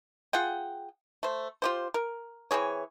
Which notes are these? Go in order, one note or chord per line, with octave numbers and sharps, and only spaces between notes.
F4 G#4 F#5 G5
A3 C5
F4 G4 C5
A#4
E3 C4 G#4 C#5